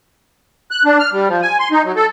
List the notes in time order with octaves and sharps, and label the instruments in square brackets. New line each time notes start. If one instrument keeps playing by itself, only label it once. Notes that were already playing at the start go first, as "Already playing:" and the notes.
[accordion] F#6
D4
F6
G3
F3
G#5
C6
D#4
F#3
A4